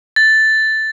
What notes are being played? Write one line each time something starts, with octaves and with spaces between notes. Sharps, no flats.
A6